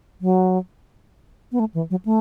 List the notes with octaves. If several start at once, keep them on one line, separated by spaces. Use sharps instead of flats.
F#3
B3
A3
E3
F#3
A3